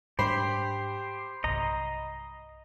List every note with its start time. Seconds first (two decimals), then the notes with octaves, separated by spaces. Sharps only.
0.19 G#2 G3 D4 G4 C5 B5 C7
1.44 B1 G2 C3 D#5 A#5